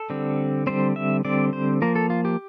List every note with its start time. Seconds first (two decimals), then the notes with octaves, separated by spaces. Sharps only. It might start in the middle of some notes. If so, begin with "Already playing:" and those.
Already playing: A4
0.10 D3 G3 C4
0.67 D3 G3 C4 C5
0.96 E5
1.25 D3 G3 C4 D5
1.53 C5
1.82 F3 A#3 A#4
1.96 A4
2.10 F4
2.25 G4